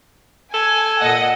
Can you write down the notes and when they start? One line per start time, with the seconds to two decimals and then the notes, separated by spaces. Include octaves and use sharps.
0.54 A4 G#5
1.00 A#2 D#5 F#5